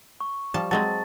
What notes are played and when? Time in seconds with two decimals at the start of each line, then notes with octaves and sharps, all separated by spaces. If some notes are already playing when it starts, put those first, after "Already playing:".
0.20 C#6
0.54 F3 G3 A5
0.71 F#3 G#3 C4 A5 A6